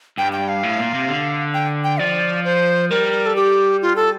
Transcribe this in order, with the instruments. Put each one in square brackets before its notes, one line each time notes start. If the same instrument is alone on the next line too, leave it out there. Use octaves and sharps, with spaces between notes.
[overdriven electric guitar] G2 [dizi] G5
[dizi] G5
F5
[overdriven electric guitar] A2
A#2
C3
D3
[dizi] G5
G5
[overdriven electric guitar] F3 [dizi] D5
[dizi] C5
[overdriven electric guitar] G3 [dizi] A#4
[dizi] A4
G4
F4
A4